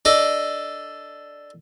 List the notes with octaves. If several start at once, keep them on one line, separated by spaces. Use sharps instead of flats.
D4 A4 D#5